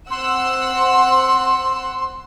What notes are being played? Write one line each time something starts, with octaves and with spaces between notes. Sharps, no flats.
C4 F#5 C6 E6